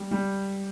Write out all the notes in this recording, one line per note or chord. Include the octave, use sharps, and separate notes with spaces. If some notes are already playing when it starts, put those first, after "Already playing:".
Already playing: G3
G3